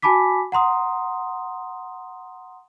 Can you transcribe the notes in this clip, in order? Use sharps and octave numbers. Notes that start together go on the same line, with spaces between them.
F#4 G#5 A5 B5 D6 B6
F#5 A#5 C6 D#6